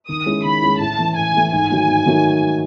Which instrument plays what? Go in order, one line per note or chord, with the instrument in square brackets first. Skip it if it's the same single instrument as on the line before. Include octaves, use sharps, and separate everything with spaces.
[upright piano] D#3 [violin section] D#6
[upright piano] G#3 C#4 E4
[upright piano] D#3 [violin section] B5
[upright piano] G#3 C#4 E4
[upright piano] A2 [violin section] A5
[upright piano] E3 A3
[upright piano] A2 [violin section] G#5
[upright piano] E3 A3
[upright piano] G#2 [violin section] G#5
[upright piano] D#3 F#3 A3 D#4
G#2
D#3 F#3 A3 D#4